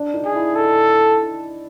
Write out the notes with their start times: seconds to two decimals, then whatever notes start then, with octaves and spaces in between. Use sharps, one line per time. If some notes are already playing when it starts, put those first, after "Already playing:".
Already playing: D4
0.14 D#4
0.25 G#4
0.35 E4
0.56 A4